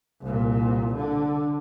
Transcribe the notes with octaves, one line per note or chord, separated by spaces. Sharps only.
C2 A#2
D3